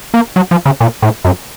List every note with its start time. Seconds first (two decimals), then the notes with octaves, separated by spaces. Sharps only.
0.14 A#3
0.36 F#3
0.51 F3
0.66 C#3
0.80 A#2
1.02 A2
1.25 F#2